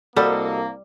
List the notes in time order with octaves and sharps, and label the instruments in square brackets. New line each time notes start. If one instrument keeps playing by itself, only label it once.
[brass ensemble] C2 A#3 [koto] G3 [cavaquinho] F#4 A4 D#5